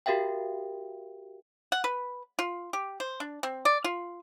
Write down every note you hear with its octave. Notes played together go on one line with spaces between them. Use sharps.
F#4 G4 A#4 E5 F5 G5
F#5
B4
F4
G4
C5
D4
C4
D5
F4